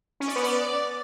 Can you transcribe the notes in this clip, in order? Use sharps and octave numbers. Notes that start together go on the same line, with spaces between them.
C#4
D5
B3
D5